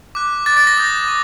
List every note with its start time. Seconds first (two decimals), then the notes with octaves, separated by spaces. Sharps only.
0.15 D6 F#6
0.46 D6 F#6 A6
0.57 A6
0.67 A#6
0.77 D#6 G6 A6
1.08 C#6